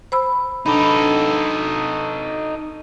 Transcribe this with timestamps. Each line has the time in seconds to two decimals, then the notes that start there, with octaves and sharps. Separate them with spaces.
0.12 C5 B5 E6
0.66 D4 D#4 A4 B5